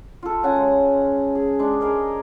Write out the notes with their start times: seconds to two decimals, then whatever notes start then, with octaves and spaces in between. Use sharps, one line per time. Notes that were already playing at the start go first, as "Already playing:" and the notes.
0.23 F4 A4
0.43 C#3 F#5 G#5
0.56 G#3
1.35 G#4
1.59 G#3 D4
1.81 G#4 A#4 D#5